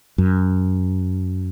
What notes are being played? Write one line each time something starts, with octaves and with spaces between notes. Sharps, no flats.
F#2